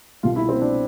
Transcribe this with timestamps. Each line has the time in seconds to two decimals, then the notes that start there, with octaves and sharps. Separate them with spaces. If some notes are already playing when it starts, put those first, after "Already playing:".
0.23 C2 B2 F4
0.36 E4
0.49 C4
0.61 D4